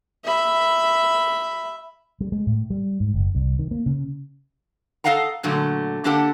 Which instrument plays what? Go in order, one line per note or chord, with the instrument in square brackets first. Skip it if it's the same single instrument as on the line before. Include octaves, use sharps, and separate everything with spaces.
[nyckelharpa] E5 B5
[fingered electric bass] G3
G#3
A2
G3
G#2
F#1
C2
D#3
A#3
C#3
[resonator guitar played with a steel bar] A4 B4 D#5 F5 F#5 A#5
A#2 D3 F#3 A3
D3 A#3 D4 G4 A4 F#5